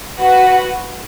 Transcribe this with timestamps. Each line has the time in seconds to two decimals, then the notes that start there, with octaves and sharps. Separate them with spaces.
0.19 F#4 B4 F#5